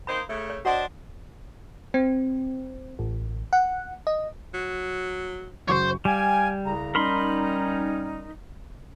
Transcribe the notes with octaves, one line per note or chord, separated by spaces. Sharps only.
A#3 D#4 C5 B5
C#3 A3
C#5
D4 F#4 C5 D#5 F#5 C6
C4
A1
F#5
D#5
F#3
F#1 F#4 C5 C#5 C#6
G3 F5 G5 G#5
C2 C#3 A#5
G3 C#4 D#4 A#4 B5 C6